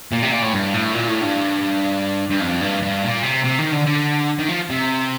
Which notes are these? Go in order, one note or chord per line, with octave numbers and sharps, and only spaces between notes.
A#2
C3
A#2
A2
G2
A2
A#2
A2
G2
G2
F2
G2
G2
A#2
C3
C3
D#3
D3
D3
D#3
F3
C3